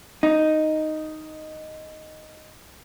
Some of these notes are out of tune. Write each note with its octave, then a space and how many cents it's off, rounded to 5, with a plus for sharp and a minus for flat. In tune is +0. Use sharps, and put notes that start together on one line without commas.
D#4 +0